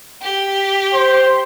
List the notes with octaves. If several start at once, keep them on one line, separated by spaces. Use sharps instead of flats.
G4
C5